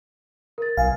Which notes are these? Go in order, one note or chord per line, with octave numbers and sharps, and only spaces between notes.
A#4 A6
B1 F5 G#5